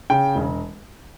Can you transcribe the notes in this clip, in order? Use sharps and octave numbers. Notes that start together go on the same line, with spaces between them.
C#3 G5
E1